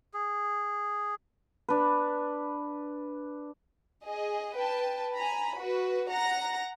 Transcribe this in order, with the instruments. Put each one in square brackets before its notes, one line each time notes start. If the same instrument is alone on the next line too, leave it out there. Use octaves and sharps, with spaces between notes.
[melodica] G#4
[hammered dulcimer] D4 B4
[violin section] G#4 D#5
B4 G5 A5
G#5 A#5 B5
F#4 B4
F#5 A#5 A#6